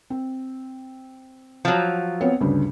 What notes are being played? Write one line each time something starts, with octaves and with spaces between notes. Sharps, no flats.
C4
F3 F#3
B3 C4 C#5
D2 G2 C#3